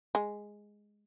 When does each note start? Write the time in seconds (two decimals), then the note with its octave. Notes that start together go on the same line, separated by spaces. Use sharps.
0.15 G#3